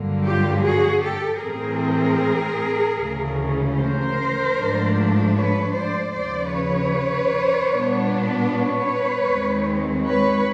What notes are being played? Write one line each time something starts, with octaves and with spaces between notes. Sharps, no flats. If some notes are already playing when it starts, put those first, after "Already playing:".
Already playing: G2 D3 F#3 A#3
F4 G4
F#4 G#4
G4 A4
A2 E3 A3 C4 G#4 A#4
D2 C#3 E3 A3 C#4
A#4 C5
G#2 F3 A3 D4
B4 C#5
C5 D5
D#2 C#3 F3 C5 D5
B4 C#5
A#2 G3 B3 D4
B4 C#5
D#2 D#3 G#3 C4
B4 C#5